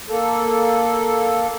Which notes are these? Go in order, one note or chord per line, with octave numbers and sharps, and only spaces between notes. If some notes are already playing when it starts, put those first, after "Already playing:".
A#3 A4